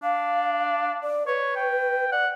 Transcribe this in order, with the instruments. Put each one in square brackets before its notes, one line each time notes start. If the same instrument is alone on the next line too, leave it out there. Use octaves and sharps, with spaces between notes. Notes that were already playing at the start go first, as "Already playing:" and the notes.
[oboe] D4 [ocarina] F5
[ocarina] D5
[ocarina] B4 [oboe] C#5
[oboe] G5
[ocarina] D5 [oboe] F#5